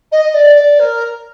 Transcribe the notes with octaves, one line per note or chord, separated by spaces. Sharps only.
D#5
D#5
D5
D5
A#4